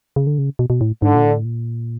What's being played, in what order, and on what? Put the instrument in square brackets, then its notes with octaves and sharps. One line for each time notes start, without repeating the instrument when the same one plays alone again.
[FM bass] C#3
D3
C#3
B2
B2
A2
[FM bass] G#2 [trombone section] D3
[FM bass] A#2
A2
A#2